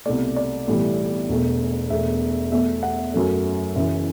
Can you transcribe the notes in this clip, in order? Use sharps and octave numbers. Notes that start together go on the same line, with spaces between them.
C2 B2 A3 D5
D5
B1 A2 E3 G3
E1 E2 B2 A3
E1 E2 B2 A3 E5
E2 B2 A3 E5
F#5
F#2 F#3 A3
F#1 F#2 E3 E5